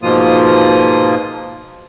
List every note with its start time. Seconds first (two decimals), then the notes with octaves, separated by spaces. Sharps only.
0.02 G#2 B2 F3 A#3 F4 D#6